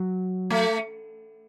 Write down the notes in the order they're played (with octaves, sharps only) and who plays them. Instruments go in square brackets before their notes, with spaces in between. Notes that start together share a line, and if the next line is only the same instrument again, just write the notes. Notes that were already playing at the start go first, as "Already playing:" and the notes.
Already playing: [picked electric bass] F#3
[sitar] A3